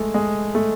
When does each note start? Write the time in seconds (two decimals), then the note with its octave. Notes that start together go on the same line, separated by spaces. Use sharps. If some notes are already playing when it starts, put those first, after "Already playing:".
Already playing: G#3 A3
0.14 G#3
0.55 A3